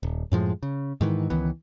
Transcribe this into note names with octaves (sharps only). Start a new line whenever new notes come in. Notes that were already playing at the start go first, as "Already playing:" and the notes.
D#1
F#2 A2 F3 G#3
C#3
G#2 D#3 E3
C#2 D#3 E3 B3